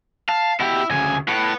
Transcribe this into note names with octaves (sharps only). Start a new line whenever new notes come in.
F5 A5
B2 E4 G4
D2 C#3 G#5
A2 B4 F#5